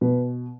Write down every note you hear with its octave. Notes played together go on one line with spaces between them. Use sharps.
B2 B4